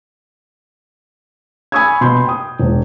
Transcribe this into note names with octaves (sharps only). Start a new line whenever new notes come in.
G#5 B5 C#6 D#6 E6 G#6
B2 B5 C6 G6
G5 D#6
E1